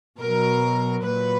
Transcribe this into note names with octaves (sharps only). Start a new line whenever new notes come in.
B2 F#3 A#4
A#2 F#3 B4